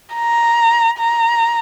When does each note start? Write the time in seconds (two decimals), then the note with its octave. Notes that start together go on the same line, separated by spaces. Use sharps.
0.15 A#5
0.99 A#5